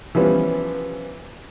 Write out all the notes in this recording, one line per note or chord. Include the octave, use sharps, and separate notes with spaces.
E3 F3 G3 B3 C#4